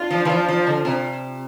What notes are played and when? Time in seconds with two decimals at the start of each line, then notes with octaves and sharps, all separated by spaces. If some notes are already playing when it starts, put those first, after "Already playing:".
Already playing: D4 F4
0.11 F3
0.25 E3
0.30 F3
0.49 F3
0.67 D3
0.85 C3